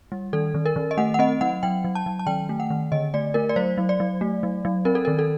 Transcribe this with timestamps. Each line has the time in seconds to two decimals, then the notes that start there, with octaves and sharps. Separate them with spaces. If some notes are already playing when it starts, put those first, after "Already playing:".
0.12 G3
0.33 D#3 A4
0.55 D#3
0.66 A#4
0.76 D#3
0.91 D#5
0.98 A3 F#5
1.14 F#5
1.19 C4 D#5
1.41 F#3 F#5
1.63 F#3 G5
1.85 F#3
1.95 A5
2.06 F#3
2.19 A5
2.27 D#3 G5
2.49 A3
2.60 F#5
2.70 D#3
2.92 D3 D#5
3.14 A3 D5
3.34 A3 A#4
3.49 D5
3.56 F#3 C5
3.78 F#3
3.89 D5
4.00 F#3
4.21 A3
4.43 F#3
4.65 F#3
4.85 C4 A#4
4.95 A4
5.05 D#3 A#4
5.19 A4